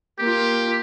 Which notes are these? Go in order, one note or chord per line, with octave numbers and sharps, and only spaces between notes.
A#3 F4 G4